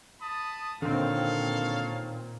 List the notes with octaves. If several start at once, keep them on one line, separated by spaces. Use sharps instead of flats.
A5 B5 D#6
A#2 D3 D#3 C4 A4 C#5 F5